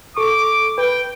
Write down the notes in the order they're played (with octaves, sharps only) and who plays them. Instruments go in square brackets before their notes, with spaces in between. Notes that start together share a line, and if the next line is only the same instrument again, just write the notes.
[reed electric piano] A4 C#6 [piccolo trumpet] D6
[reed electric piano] B4 [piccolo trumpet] G5